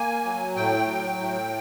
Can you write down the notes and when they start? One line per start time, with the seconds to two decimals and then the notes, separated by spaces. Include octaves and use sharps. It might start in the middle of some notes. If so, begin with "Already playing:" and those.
Already playing: A#3 G#5
0.25 F#3
0.56 A2 G5
0.87 F#3
1.19 A2